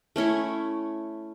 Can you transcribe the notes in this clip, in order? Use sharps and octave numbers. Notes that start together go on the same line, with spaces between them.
A3 C#4 E4 C#5